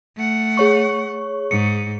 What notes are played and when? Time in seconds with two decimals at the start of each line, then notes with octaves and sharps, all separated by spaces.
0.17 A3 F#5
0.57 G#4 C#5 C#6
1.51 G#2 C#7